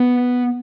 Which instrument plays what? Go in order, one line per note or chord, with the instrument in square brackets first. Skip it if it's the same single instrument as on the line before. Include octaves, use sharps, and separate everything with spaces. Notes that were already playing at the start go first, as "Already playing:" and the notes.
Already playing: [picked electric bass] B3